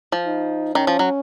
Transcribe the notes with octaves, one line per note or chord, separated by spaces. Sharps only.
F3
D#4
D#3 C#4
F3
F#3